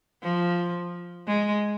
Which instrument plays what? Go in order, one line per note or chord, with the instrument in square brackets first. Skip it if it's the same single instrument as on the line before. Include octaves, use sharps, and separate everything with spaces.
[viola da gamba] F3
G#3